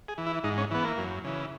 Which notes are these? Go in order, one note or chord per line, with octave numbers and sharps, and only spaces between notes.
G#4
E3
E4
G#2 D#4
C#4
E3 B3
A#3
F#2
C#3 E3